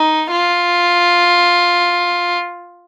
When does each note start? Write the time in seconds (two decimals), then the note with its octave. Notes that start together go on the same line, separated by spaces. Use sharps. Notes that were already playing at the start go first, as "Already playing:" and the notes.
Already playing: D#4
0.31 F4